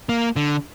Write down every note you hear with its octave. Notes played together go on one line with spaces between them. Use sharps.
A#3
D3